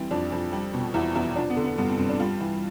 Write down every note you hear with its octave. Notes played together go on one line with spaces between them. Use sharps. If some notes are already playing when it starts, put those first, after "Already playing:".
Already playing: E3 G3 C4
F2 D4
F2
G3
B2
E2 E4
E2 E4
F3 D4
B3
D3
B3
G2 B3
C4
G2 C4
D4
G3 F4
E3